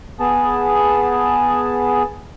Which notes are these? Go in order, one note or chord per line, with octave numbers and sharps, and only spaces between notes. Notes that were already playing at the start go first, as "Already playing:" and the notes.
B3 G#4 A5